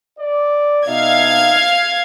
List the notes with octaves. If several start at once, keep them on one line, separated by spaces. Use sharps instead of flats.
D5
B2 D#4 E5 F5 G#6